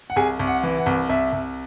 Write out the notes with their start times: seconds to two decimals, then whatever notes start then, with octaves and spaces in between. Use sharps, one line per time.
0.10 F#5
0.16 C2 G#4 G#5
0.39 C2
0.47 F#5
0.63 E3
0.78 F#5
0.86 C2
1.09 C2 E5
1.33 C2